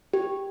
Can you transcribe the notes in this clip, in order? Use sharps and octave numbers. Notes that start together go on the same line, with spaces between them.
G4